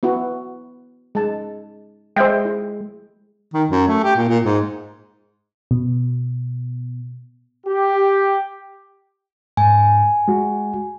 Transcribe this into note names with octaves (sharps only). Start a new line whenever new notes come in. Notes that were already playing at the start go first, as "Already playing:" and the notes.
B3 E4 F#4
G#3 A5
G#3 C5 E5 G5
E4
D#3
F#2
A3
G4
A#2
A#2
G#2
B2
G4
G#2 G#5
G#3 F#4